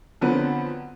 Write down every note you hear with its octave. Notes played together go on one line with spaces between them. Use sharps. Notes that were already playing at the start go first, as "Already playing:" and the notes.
D3 F3 F#3 B3 C4